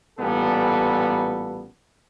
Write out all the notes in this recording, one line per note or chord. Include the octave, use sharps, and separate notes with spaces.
A1 A#2 G3 B3 A4